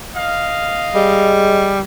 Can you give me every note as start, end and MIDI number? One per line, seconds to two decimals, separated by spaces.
0.15 1.39 75
0.15 1.39 77
0.95 1.81 55
0.95 1.74 56